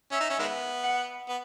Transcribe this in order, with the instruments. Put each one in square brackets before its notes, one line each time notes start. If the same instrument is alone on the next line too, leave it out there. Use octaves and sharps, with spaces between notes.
[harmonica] C#4 [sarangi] E5
[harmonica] D#4
C#4
D#3 G#3 B3
[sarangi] F#5
[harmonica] B3